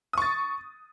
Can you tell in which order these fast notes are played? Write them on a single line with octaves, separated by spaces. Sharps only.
D#6 C#6 A6